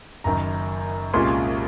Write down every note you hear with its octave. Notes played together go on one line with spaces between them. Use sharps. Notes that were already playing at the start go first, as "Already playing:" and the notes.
F#1 F#2 D#3 A#5
C2 A#2 G#3 C#4 F4 C6